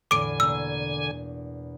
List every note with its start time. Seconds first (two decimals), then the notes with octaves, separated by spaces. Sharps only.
0.11 E2 A2 D3 G#5 D6 D7
0.40 B2 A#3 D4 E6